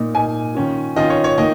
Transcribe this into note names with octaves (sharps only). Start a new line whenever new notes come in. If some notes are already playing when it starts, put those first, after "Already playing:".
Already playing: A#2 A#3 D#4
A#2 A#3 D#4 G#5
D#3 C#4 F4
D#3 C#4 F4 D#5
C#5
C#5
D#3 A#3 D#4 D#5